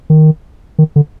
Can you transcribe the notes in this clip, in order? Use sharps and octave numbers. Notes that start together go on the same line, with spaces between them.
D#3
D#3
D3